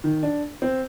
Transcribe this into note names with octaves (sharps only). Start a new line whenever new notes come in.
D#3
D4
C4